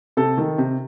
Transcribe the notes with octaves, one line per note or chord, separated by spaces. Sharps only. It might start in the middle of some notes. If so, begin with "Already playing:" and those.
C3 A4
D#3
C3